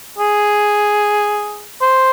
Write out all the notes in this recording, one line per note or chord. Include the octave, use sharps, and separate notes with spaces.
G#4
C5